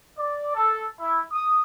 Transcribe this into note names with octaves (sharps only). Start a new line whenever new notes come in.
D5
A4
E4
D#6